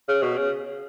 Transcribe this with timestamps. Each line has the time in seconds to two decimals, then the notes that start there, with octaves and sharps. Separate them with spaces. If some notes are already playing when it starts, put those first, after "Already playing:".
0.08 C#3
0.22 B2
0.37 C#3